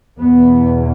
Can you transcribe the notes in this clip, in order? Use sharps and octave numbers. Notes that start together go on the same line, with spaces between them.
E2 B2 B3